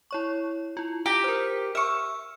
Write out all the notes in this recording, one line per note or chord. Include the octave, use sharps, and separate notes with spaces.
E4 C#5 C#6
E4 F4
G4 A#5 A#6 B6
A#4 C5
E5 C#6 E6 F6